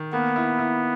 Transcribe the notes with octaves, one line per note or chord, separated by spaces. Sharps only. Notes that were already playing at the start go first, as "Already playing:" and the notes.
Already playing: D#3
A#3 B3
E4
E4